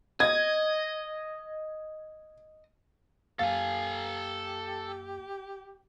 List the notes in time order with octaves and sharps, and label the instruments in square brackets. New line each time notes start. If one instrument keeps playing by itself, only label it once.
[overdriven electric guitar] D#5 [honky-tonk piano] G#6
[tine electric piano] F#2 A#3 A6 [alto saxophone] G4 [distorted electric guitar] A4 G#5 [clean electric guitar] F5